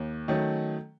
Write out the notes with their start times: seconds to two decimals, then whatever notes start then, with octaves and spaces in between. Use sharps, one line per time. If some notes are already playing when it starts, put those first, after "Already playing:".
Already playing: D#2
0.28 D#3 F#3 A3 C#4